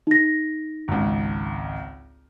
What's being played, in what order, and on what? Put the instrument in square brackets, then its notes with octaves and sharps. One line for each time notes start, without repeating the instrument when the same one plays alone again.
[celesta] D#4 A#6
[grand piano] G#1 C#2